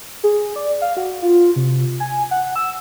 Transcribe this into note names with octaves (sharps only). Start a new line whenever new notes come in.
G#4
D5
F5
F#4
F4
C3
G#5
F#5
E6